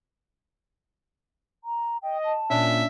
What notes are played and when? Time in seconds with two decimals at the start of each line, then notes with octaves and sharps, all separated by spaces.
1.64 A#5
2.03 D#5 G5
2.25 A5
2.50 A#2 C#4 D4 E5